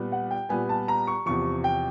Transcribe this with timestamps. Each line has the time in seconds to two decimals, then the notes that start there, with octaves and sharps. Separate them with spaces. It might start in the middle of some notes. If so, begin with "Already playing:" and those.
Already playing: A#2 G3 B3
0.12 F#5
0.31 G5
0.49 A#2 G3 B3 G#5
0.69 A5
0.88 A#5
1.07 C#6
1.26 E2 C3 F3 C#6
1.64 G5